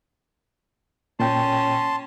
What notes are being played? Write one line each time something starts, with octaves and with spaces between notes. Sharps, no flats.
A#2 C#4 G5 A5 C6